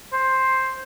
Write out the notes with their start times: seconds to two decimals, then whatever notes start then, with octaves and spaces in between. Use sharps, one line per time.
0.13 C5